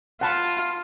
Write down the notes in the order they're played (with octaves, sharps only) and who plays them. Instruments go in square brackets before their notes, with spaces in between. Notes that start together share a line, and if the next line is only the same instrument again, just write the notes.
[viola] F4 [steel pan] F#5 A5 B5